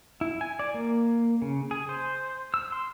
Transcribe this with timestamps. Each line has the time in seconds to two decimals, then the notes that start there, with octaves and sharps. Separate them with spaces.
0.21 E4
0.41 G#5
0.59 D5
0.74 A#3
1.42 C#3
1.71 G#4
1.89 C5
2.54 E6
2.72 C6